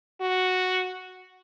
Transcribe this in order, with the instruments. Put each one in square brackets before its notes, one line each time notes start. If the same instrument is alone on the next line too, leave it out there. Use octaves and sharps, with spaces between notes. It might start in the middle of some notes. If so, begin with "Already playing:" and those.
[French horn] F#4